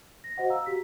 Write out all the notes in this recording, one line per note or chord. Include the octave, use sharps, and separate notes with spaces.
A#6
F#4 C5 D#5 F#5
F5 A#5 E6
F#4 G4 B6